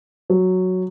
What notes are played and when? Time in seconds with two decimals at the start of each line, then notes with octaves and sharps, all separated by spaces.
0.30 F#3